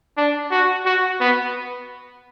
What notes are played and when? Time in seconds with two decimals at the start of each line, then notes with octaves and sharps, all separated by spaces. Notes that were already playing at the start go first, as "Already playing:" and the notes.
0.17 D4
0.51 F#4
0.86 F#4
1.21 B3